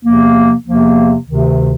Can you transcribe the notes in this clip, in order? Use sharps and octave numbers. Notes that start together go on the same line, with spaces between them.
E2 C3 F3 A#3
E2 C3 F3 A#3
D2 C3 D#3